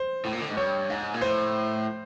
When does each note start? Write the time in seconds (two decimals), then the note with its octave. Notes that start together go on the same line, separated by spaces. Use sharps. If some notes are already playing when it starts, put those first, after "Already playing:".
Already playing: C5
0.25 A2
0.33 A#2
0.41 D3
0.49 G#2
0.57 G2 C#5
0.89 G#2
1.14 A#2
1.21 A2 C5